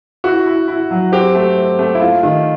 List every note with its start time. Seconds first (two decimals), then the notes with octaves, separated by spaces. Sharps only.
0.24 E4 F#4
0.46 E4
0.68 E4
0.91 F#3
1.12 C4 G4
1.34 A3
1.57 C4
1.79 A3
1.95 E4
2.01 A3 F4
2.23 D#3